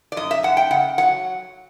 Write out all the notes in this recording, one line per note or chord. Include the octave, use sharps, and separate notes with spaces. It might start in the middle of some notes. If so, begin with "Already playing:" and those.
D5
F#2 D#5
E5
F#2 F#5
G5
C#3 F#5
F#3 F#5